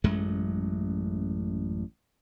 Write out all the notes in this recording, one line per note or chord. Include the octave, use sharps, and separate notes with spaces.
A1 F#2 G#3 A3